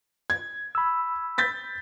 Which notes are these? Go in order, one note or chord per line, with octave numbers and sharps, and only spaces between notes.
G#6
B5 E6
G6 A6 B6